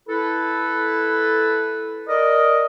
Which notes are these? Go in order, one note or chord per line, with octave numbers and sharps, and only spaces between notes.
E4 A4 B4
A#4 D5 D#5